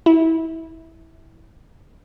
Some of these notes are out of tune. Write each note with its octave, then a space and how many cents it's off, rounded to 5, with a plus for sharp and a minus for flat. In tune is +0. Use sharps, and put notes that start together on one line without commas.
E4 -15